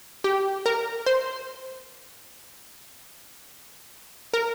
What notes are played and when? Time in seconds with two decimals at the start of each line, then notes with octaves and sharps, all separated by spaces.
0.24 G4
0.66 A#4
1.06 C5
4.34 A#4